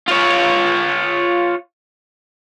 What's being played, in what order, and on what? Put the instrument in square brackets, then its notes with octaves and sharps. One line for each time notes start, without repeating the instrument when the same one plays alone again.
[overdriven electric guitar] F4 C#5